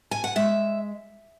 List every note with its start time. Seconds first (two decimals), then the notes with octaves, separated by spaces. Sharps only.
0.11 G#5
0.24 F#5
0.36 G#3 E5